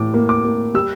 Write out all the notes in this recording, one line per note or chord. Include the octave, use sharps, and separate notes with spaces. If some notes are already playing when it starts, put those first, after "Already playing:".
Already playing: A2 E3 D6
A#3
D6
A#3
G3 E6